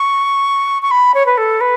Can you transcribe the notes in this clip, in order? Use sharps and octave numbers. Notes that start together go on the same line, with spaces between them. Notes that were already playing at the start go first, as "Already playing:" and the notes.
Already playing: C#6
C#6
B5
C#5
B4
A4
B4